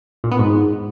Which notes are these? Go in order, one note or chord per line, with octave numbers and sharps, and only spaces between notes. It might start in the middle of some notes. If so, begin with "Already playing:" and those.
A#2
B3
G#2